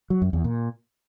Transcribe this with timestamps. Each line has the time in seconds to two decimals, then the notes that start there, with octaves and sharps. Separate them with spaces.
0.10 F#3
0.22 F#2
0.33 E2
0.44 A#2